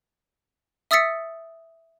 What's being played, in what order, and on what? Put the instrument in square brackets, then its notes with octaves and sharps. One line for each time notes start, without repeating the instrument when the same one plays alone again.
[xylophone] E5 D#6 E6 A6 B6 C#7